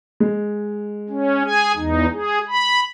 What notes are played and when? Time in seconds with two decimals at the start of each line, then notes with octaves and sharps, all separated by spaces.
0.20 G#3
1.10 C#4
1.44 G#4 G#5
1.76 E2 D#4
2.13 G#4
2.48 B5